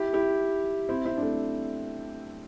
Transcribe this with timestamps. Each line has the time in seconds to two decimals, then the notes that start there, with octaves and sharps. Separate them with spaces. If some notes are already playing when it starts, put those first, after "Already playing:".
Already playing: E4 G4
0.14 E4 G4
0.89 C4 E4
1.05 C4 E4
1.17 D4
1.22 A3 C4